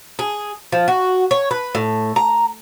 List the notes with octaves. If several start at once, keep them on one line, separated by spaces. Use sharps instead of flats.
G#4
F3
F#4
C#5
B4
A2
A#5